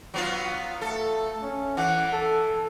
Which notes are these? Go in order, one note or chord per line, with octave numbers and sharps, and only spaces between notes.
F#3 B3 F4
A3 A4
C#4
E3 F#5
A4